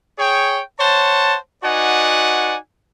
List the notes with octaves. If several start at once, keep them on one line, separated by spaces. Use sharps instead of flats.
G#4 C#5 G5
C5 C#5 F#5 A5
D#4 F#4 B4 D5 F#5 G#5